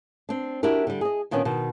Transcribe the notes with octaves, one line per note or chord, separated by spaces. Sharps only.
C4 D4
D4 E4 F#4 G4 A#4
D3 G3
G#4 D#5
A#2 D#3 B3 C#4 D4
B2 D#3